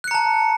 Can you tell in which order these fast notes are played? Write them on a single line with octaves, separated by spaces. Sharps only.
F#6 C#7 A#5 A5